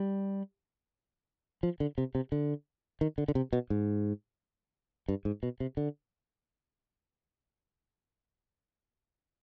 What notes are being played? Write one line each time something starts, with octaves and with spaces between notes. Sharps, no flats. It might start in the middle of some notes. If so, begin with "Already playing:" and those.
Already playing: G3
F3
D3
C3
C3
D3
D#3
D3
D3
C3
B2
G#2
G2
G#2
B2
C3
D3